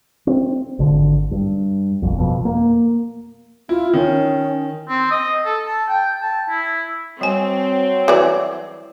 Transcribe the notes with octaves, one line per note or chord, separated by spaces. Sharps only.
C4
G#1 D3
G2
F1 A#1 F2
F2 B2
A#3
E4 F4
D#3 C#4
C4
D#5
A4
A5
G5
A5
E4
F#3 G3 C4 G#5
E3 F#4 D5